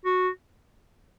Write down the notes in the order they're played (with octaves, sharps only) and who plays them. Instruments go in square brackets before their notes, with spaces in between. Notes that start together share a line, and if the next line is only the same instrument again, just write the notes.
[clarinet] F#4